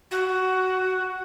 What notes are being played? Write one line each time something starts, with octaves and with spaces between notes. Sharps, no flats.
F#4